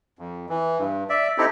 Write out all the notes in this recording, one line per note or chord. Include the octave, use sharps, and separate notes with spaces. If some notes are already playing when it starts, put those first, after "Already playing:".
F2
E3
G2
D5 E5
C4 D#4 E4 G4 A4